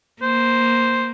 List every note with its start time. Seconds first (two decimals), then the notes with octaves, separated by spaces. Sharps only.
0.22 A#3 C5